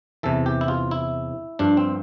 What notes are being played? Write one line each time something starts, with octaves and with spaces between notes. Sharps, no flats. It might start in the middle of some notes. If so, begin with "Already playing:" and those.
E2 C3 E3 A4
G4
E4
F4
E4
G2 F3 D4
C4